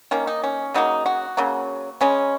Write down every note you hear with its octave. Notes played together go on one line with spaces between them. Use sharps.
D#3 A#3 C#4
D#4
C#4
C#3 F#3 A#3 D#4
F#4
C#3 F#3 A#3
C#3 G#3 C#4